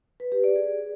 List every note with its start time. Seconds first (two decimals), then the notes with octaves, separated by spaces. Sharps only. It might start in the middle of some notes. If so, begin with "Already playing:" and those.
0.20 B4
0.32 G4
0.44 D5
0.56 G#4